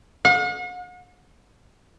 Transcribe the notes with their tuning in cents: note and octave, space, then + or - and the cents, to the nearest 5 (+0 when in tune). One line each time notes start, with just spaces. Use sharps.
F#5 -45